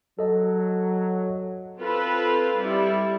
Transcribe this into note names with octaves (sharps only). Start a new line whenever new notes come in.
F#3 A4 D#5 A5
C4 F4 A4 B4
G3 E4